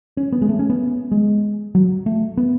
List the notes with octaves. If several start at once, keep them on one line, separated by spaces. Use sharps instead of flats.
C#4
B3
G#3
A3
C#4
B3
G#3
F#3
A3
B3